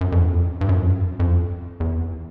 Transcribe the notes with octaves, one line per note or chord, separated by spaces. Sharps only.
F#2
F2
E2
F2
G2
F#2
F2
F#2
F2
E2